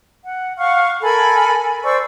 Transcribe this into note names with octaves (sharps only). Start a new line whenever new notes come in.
F#5
F5 F#5 C#6 F6
A4 A#4 G#5 B5
C5 D5 C#6 E6